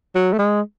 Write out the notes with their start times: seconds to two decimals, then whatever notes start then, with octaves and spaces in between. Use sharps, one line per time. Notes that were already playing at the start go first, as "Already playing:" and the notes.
0.15 F#3
0.33 A3
0.39 G#3